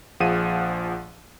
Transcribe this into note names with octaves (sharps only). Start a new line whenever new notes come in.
A#1 F3 G#4 F5 F#5 D#7